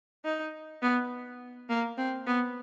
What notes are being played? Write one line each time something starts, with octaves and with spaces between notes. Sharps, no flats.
D#4
B3
A#3
C4
B3